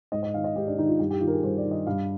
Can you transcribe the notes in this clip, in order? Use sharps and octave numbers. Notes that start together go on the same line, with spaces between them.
G#2 D#5
D#5
D#3 F5
D#5
G#2 G4
D4
D#3 D#4
F4
G2 G4
G4
D#3 F4
A#4
G#4
G2 C5
D5
D#3
D#5
G2 F5